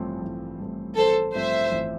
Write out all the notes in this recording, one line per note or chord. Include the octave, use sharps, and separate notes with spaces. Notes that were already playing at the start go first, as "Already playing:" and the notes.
Already playing: A1 G2 F3 A3 C4
A1
G2 F3 A3 C4
A1 A4 C5
G2 F3 A3 C4 C5 E5
A1